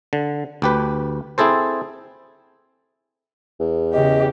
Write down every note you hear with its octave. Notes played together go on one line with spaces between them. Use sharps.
D3
D2 G4 B4
C4 E4 G#4 A4 C5
E2
C#3 G4 D#5